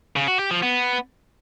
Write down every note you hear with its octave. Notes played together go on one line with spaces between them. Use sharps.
C#3
F#4
G4
F3
B3